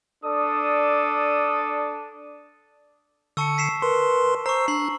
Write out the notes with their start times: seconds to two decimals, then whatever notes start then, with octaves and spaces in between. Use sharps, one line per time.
0.24 D4 A4 D5 D#6
3.37 D3 A5 C#6 E6 C#7
3.58 B6 C7 E7
3.82 A#4 B4 C6
4.46 C5 A#5 C#6 E6 C7
4.68 D4 C7 F#7